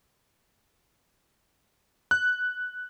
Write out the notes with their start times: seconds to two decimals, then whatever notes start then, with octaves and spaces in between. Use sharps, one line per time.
2.11 F#6